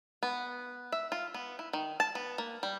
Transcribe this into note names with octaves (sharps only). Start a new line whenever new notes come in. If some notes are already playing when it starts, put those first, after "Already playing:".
B3
E5
F4
B3
E4
D#3
A5
B3
A#3
G3